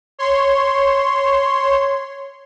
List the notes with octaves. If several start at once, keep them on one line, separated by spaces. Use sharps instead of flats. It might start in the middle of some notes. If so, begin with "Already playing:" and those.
C#5 C6